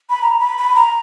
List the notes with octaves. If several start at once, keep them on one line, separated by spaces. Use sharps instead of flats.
B5
A#5
B5
B5
A#5